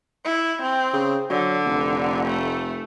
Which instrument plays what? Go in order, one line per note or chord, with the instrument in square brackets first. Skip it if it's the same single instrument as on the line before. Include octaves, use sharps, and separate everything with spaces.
[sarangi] E4
C4
[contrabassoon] C#3
[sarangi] D3 [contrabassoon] F#3
[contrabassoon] F1
[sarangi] A3